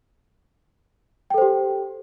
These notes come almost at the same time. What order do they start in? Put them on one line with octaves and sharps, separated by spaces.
G5 A4 C5 G4